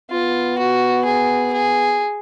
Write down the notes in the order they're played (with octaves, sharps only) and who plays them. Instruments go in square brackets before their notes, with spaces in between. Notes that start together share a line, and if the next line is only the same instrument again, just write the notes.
[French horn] B3 [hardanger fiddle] F4
[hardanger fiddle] F#4
G#4
G#4